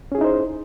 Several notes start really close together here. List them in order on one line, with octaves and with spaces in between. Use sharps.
C#4 G#4 E4 D#4 C5